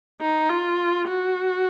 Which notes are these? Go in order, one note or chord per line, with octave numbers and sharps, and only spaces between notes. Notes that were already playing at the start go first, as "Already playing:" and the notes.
D#4
F4
F#4